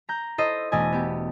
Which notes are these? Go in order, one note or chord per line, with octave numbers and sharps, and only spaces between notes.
A#5 G6
E4 A4 C5 D#5
E1 A3 D5 D#5 G#5
B3 G4